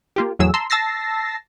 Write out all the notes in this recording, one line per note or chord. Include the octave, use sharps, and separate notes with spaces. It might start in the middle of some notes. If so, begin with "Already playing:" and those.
A#3 F4 G4
E2 A2 F#3 G#4 E6
A5 A#5 C6 E6
A5 E6 A6 A#6 C7